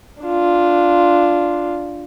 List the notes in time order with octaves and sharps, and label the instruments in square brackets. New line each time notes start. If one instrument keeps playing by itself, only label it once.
[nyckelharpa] D4 F4